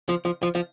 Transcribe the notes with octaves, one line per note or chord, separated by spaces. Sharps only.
F3
F3
F3
F3